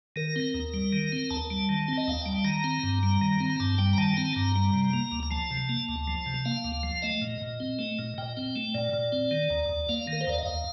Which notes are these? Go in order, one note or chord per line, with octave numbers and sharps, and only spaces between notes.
D#3 A#4
C4
D#2
G3
D#3
C4
D#2 A5
G3
D#3
C4
D#5
D#2 F5
G3 G5
A5
D#3 A#5
C4
G2
G3
D#3
C4
A#5
G2 A5
G3 G5
A#5
D#3 A5
C4 A#5
A5
G2 A#5
G3
C3
A#3
D2
A#5
F3 A5
C3
A#3
D2
F3
C3
A#3 F5
D2
F3
A3 D#5
A#2
A#2
C4
A3
A#2
A#2 G5
C4
A3
A#2 D5
A#2
C4
D#3
D#2
D#2
A#3 F5
D#3 A#4
C5
D#2 D5
D#5
D#2 F5